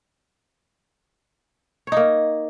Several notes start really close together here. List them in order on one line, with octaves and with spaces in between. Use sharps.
C#5 D#4 A#3